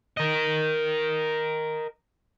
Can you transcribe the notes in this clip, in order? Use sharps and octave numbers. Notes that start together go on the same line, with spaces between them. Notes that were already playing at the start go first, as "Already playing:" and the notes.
A#4 D#5